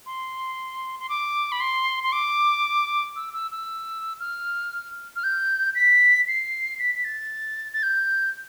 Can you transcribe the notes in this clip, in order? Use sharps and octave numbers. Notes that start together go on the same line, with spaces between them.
C6
C6
D6
B5
C6
C6
D6
E6
E6
E6
F6
F6
G6
B6
C7
B6
B6
A6
A6
G6